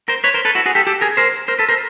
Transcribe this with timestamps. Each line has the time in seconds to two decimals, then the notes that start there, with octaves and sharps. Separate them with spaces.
0.08 A#4 C5
0.24 B4 C#5
0.34 A#4 C5
0.45 A4 B4
0.55 E4 F#4
0.66 F#4 G#4
0.75 G4 A4
0.87 G4 A4
1.01 G#4 A#4
1.17 A#4 C5
1.48 A#4 C5
1.59 A4 B4
1.69 A#4 C5